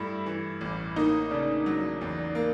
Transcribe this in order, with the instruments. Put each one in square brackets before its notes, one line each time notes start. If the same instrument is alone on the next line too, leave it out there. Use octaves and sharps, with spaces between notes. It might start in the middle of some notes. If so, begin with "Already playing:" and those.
Already playing: [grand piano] G2 A3 [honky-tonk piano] E4
[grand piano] E3
A1
[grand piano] A#3 [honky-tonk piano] D#4
[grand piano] C#3 [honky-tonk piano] D4
[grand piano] F#3
E2
A#3